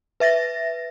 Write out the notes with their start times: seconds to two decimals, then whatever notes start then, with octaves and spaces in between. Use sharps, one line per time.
0.20 B4 E5 A6 A#6